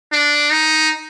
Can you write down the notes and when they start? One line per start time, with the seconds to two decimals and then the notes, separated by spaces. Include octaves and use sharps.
0.12 D4
0.51 D#4